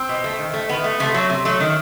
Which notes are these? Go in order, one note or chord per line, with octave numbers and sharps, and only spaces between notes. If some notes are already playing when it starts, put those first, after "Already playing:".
Already playing: C4
B2
A3
D#3
A3
D#3 B3
A3
C3 A3
F#3 A3
C3
F#3 A3
D#3